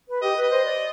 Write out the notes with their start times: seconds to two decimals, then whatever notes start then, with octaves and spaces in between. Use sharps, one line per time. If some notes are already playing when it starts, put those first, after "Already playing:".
0.08 B4
0.22 G4 D#5
0.36 B4
0.42 D#5
0.50 C5
0.64 D5